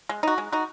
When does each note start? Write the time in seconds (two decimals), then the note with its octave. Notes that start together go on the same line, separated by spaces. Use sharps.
0.09 G#3
0.23 D#4 F#4
0.38 G#3
0.52 D#4 F#4